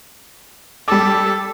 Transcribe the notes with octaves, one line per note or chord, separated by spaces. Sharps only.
G3 A4 D6